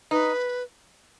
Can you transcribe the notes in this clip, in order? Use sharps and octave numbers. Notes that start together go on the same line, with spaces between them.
D#4 B4